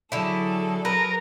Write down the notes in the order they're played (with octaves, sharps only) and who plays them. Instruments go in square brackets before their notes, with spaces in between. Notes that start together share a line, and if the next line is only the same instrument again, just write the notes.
[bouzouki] D3 E4 [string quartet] F#3 G#4 A4
[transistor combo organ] A#4 [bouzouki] B4